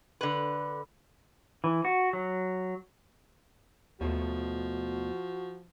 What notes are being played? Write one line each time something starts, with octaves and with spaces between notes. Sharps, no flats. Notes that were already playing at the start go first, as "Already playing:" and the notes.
D3 B4
E3
F#4
F#3
D#2 B2 F3 A3 F#4